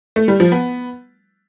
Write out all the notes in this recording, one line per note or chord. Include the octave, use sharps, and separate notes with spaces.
A3
G3
F3
B3